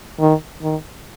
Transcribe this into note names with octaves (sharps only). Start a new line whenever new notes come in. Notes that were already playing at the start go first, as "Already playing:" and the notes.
D#3
D#3